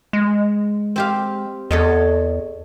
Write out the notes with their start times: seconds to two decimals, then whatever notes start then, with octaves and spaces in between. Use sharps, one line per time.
0.13 G#3
0.96 C4 G4 F5
1.71 E2 A4 C#5 D#5